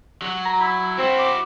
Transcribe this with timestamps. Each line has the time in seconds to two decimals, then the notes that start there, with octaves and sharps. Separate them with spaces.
0.22 F#3 F#4
0.46 A#5
0.61 E4 B5
0.99 C4 E4 F#4
1.18 D6